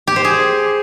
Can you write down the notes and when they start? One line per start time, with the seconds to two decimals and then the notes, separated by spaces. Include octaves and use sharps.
0.07 G4
0.16 C5
0.25 G#4